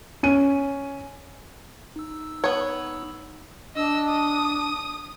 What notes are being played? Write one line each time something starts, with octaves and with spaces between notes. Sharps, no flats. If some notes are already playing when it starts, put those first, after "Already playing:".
C#4 D#7
D#4 E6
B3 C#5
D4 D#5 E6
D#6